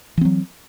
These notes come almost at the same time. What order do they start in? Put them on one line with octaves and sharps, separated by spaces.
E3 C4 F#3